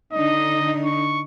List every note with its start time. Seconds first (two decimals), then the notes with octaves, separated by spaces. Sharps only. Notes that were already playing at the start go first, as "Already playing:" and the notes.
0.13 D3 D4 D#4 D#5
0.85 C#6